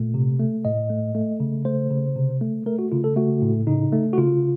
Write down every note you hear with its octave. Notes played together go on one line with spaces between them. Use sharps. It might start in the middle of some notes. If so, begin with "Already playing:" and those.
Already playing: A#2 A3
C3
A3
A2 D#5
A3
A3
C#3
A3 C5
C#3
C3
A3
A3 A#4
F#4
C#3 F4
A4
A3 F#4
A2
C#3 D#4
A3
F#4
C#3 F4